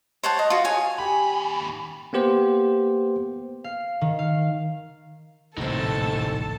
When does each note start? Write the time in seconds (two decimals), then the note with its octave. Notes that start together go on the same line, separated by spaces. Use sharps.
0.23 C5 C#5 F#5 A5
0.39 D#5
0.50 F4 F#4
0.65 G#4 C#5 G#5
0.99 D#2 G4 G#5 B5
2.13 A#3 B3 G4 C5
3.64 F5
4.01 D#3
4.19 F5
5.57 D1 A#1 A2 C3 C4 D#4 A4 A5